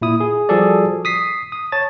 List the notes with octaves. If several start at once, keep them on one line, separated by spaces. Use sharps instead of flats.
A#2 E4 D#6
G#4
F3 G3 F#4 G#4 A4 D5
D#6 B6 C7
D#6
C#5 A5 A6